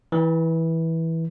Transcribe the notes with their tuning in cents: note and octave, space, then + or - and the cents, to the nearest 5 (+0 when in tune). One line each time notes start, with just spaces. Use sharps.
E3 -15